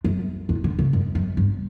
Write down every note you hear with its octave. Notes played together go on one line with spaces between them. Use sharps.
F#2
E2
D3
C#3
F#2
F#2
G2